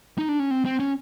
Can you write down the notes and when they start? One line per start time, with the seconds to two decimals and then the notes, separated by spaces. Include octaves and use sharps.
0.18 D#4
0.29 D4
0.40 C#4
0.51 C4
0.65 C4
0.79 C#4